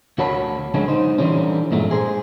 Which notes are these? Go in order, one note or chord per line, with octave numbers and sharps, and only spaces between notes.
D2 F#4 A#4 C#5 A5 B5
D3 F#3 G#3 C#4
D#4 C5
D3 E3 F3 G3 C#4
G2 A#2 G#3 A3
G#4 C5